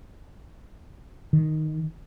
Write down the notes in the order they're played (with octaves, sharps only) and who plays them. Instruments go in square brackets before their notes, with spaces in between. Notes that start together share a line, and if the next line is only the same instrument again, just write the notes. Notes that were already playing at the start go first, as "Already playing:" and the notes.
[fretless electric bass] D#3